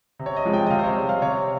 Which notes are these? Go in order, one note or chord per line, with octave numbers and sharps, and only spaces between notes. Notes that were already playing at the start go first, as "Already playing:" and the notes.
C3
C#5
D#5
F3 G#3
G5
D#5
C3 F5
C5
C#5
G3
F5
C3 C#5